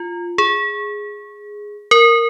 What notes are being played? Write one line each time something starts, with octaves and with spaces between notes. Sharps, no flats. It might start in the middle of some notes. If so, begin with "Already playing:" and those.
Already playing: F4
G#4
A#4